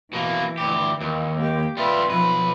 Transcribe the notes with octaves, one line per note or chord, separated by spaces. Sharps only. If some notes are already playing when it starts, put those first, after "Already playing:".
B2 E3 A#3
D2 G4
D#2
A#3 G4
G3 F4 B4 E5
B1 F3 B4